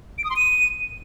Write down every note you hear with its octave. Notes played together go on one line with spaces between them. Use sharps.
D7
D#6
C6
D#7